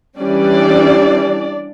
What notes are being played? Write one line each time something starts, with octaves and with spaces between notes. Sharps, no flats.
E3 G3 C#4 D4 D5